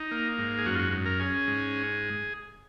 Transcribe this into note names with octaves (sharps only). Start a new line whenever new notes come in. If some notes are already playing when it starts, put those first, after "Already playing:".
Already playing: D#4
A#3
G#2
G#4
F#2 F#4
F4
F#4
F#2
A#4
C#4 G#4
G#2